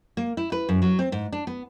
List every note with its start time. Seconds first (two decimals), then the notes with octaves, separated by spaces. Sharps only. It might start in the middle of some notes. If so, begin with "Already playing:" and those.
0.17 A#3
0.37 E4
0.52 B4
0.69 F#2
0.82 F#3
0.99 C4
1.12 G#2
1.32 D4
1.47 B3